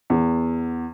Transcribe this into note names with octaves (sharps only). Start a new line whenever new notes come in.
E2